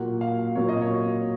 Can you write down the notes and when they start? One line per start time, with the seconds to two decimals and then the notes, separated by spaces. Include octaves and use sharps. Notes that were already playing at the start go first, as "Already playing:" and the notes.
Already playing: A#2 F#3 A#3 F#5
0.21 F5
0.55 A#2 F#3 A#3 C#5
0.69 D#5
0.82 C#5